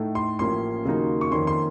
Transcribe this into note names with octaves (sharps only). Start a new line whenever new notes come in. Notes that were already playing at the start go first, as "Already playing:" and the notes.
Already playing: A2 A3 D#4
C6
A1 A2 F3 A#3 C#4 C6
D#2 C#3 F#3 A#3 D#4
C#6
F2 D#3 A#3 C#4 C6
C6